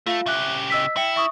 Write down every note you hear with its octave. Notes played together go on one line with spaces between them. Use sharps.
A3 F4 F5
C#3 G4 E5 F#6
D#5 E6 B6
E4 E5 G5 C#7
E5 C#6 D#6